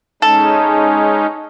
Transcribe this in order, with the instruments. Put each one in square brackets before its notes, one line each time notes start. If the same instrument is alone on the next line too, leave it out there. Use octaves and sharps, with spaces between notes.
[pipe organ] G#3 C#4 D#4 [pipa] A4